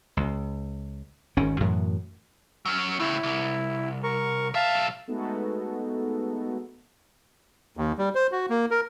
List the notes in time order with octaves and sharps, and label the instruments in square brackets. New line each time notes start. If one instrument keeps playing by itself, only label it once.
[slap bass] C#2
G#1 D#3 C#4
F#2 A2 E3 F#3
[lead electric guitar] F#3 C#4
[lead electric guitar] A2 C#3 [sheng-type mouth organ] E4
[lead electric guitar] C2
[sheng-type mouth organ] A#4 C#6
[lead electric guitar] B1 E5 [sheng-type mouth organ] F5 A5
[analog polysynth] G#3 A3 B3 D#4 F#4 A4
[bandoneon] D#2
G3
C5
F#4
A#3
A#4